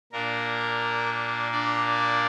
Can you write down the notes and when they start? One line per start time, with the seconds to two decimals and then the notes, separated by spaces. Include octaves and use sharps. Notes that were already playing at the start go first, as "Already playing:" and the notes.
0.12 A#2 A#3 D4 A#4
1.52 D4 D5